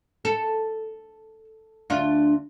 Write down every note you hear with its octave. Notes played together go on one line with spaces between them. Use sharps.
A4
D2 D4 F4